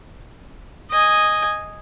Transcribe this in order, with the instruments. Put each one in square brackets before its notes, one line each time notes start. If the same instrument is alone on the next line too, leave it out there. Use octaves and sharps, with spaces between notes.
[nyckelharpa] D#5 G#5